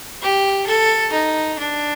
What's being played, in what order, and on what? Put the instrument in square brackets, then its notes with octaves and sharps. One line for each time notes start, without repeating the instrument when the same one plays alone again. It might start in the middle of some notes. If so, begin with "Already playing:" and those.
[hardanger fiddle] G4
A4
D#4
D4